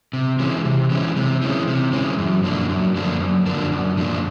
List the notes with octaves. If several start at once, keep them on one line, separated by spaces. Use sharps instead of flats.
C3
E3 G#3 C#4
C3
E3 G#3 C#4
C3
E3 G#3 C#4
C3
E3 G#3 C#4
F#2
D3 F3 A#3 D4
F#2
D3 F3 A#3 D4
F#2
D3 F3 A#3 D4
F#2
D3 F3 A#3 D4